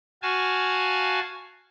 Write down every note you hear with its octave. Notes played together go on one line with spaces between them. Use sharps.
F#4 F5 G#5 A5